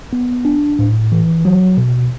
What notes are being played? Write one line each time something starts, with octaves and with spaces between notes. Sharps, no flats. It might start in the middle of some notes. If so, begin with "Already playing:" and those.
B3
D4
A2
E3
F#3
B2